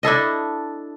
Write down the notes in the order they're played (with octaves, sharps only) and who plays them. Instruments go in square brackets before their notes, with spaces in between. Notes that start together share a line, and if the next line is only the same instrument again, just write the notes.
[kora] D4 E4 A4 D#5